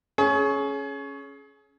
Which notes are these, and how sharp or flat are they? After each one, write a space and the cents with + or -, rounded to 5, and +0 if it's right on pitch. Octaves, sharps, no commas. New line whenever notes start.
C#4 +0 G#4 +30